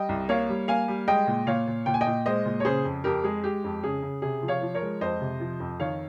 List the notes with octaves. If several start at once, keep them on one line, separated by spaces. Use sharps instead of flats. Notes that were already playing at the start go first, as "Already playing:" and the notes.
Already playing: G3 D#5 G5
C2
A#3 C#5 F5
G3
A#3 F5 G#5
G3
G#3 D#5 G5
A#2
A#2 C#5 F5
A#2
A#2 G5
G#5
D#5 G5
A#2
G#3 C5 D#5
A#2
C#5
C#3 G#4 C5
F2
F2 G4 A#4
G#3 G#4
G#3 G4
F2
C#3 G#4
C#3
C3 G#4
F3
C#5 F5
F3
A#4 C#5
G#3
F2 C5 D#5
C3
F3
F2
D#3 C#5 F5